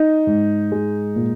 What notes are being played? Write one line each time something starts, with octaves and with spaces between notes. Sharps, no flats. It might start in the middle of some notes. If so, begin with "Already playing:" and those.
Already playing: D#4
G#2
G#3
A#2